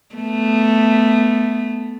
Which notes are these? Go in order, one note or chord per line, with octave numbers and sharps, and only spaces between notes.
A3 B3